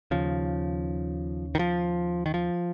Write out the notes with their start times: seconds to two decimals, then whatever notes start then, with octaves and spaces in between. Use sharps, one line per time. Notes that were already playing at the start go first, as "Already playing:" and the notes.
0.11 D#2 C#3 F3
1.55 D#3
1.59 F3
2.26 D#3
2.34 F3